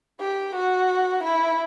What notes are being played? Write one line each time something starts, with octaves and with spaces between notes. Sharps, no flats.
G4
F#4
E4